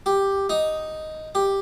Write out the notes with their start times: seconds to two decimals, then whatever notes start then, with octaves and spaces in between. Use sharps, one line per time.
0.06 G4
0.49 D#4
1.35 G4